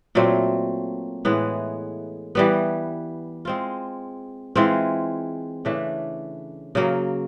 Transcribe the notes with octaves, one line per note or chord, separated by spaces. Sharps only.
A#2 F#3 A3 C4
A2 E3 G#3 B3
E3 G3 B3
G#3 C4 F4
E3 G#3 C4 F4
C#3 E3 A3 D4
C#3 F#3 A#3